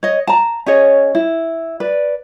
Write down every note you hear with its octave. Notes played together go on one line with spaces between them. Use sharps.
C#5 D#5
A5 A#5
C#4 G#4 C#5 D#5
E4
B4 D5